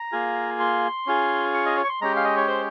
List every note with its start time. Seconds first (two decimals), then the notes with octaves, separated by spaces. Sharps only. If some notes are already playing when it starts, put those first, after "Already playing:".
Already playing: A#5
0.12 A#3 F4 G#4
0.60 C6
1.06 C#4 F4 G#4
1.54 C#6
1.66 D#5
1.77 C#5
1.84 C#6
1.89 C6
2.01 G#3 C#4 G4 A#5
2.16 F5
2.25 D#5
2.37 C#5
2.48 C5